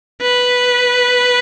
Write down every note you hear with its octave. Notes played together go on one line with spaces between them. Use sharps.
B4